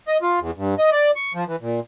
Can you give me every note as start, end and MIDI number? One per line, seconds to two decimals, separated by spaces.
0.08 0.17 75
0.22 0.40 65
0.40 0.51 40
0.57 0.75 43
0.78 0.90 75
0.92 1.11 74
1.16 1.33 85
1.34 1.44 53
1.48 1.56 52
1.61 1.80 46